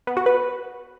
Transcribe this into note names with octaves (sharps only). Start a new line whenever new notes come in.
B3
F#4
B4